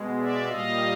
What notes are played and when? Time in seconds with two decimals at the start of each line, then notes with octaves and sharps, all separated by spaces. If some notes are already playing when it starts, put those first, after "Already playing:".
Already playing: B2 G#3
0.19 D5 E5
0.47 A#2 G3 D#5 F5